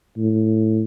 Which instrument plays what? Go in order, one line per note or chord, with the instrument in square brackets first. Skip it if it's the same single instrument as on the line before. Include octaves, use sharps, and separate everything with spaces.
[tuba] A2